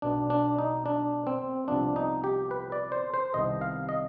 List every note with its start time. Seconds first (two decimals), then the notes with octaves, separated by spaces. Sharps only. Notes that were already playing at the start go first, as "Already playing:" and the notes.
0.02 B1 B2 B3 D4
0.30 D4
0.59 D#4
0.86 D4
1.27 C4
1.68 C2 C3 F3 B3 D4
1.96 D#4
2.24 G4
2.51 B4
2.72 D5
2.92 C5
3.14 C5
3.34 C2 C3 D#3 B3 D#5
3.61 F5
3.89 D#5